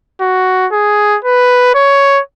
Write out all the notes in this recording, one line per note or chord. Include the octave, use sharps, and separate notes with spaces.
F#4
G#4
B4
C#5